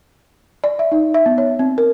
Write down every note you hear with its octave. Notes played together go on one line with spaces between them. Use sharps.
D5
E5
D#4
E5
B3
C#5
C4
A#4